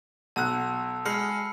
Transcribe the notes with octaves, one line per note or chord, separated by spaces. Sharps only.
B1 A5 E6 F#6
G#3 B5 F6 C7 C#7